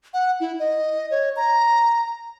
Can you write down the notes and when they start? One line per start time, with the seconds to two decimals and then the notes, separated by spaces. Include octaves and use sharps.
0.14 F#5
0.40 E4
0.59 D#5
1.11 C#5
1.36 A#5